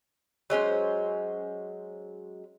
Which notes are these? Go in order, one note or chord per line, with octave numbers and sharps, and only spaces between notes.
F#3 G#3 C#4 C5